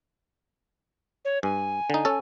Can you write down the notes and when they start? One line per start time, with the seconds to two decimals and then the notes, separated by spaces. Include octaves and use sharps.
1.25 C#5
1.43 G2 G#5
1.90 D3 D#4
2.05 C#4 A4